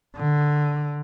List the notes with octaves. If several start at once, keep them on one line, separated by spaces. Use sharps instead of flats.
D3